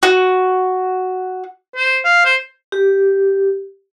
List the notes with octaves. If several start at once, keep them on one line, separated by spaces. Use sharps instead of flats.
F#4
C5
F5
C5
G4